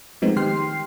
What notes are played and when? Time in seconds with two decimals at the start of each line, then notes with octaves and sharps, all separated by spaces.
0.22 F3 G#3 A3 B3 C4 D#4
0.37 D#3 G4 G5 C6 F6 C7